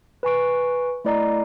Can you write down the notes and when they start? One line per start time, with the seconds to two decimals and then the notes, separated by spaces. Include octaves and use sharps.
0.23 B4 G#5 C#6 D7
1.05 A3 E4 D5 D#5 A#5